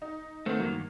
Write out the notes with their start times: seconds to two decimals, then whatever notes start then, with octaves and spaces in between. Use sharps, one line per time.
0.02 D#4
0.46 D#3 A3 B3 C4
0.60 G2 D#3 F#3 A#3